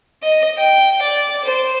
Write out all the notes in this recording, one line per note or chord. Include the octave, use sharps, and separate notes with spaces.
D#5
G5
D5
C5